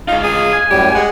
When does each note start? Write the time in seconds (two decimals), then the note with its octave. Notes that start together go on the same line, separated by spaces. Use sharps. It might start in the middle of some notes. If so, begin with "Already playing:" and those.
0.08 G#3 D#4 F4 F5
0.23 G#4
0.53 G#5
0.71 F#2 A2 G3 G4
0.95 G#3 F#5